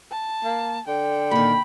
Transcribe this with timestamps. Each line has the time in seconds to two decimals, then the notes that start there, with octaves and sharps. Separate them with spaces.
0.11 A5
0.44 A#3
0.88 D3 G5
1.31 A#2 D#3 B5